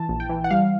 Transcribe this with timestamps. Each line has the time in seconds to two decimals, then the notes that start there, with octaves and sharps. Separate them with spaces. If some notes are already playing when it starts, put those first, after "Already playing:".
Already playing: E3 A5
0.09 A#1
0.20 G5
0.29 E3
0.44 F#5
0.51 G3 F5